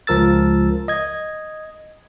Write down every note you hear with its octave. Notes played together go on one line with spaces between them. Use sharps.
C#2 F3 A#4 E6 A6
D#5 G#6